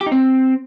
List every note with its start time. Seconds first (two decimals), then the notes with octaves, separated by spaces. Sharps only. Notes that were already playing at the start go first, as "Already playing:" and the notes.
0.01 G4
0.06 D#4
0.12 C4